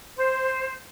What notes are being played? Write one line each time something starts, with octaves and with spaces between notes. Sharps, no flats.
C5